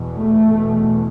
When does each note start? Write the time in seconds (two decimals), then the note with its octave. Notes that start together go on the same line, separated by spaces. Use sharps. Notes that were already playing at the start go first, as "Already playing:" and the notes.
Already playing: E2 B2
0.14 A3
0.52 E2 B2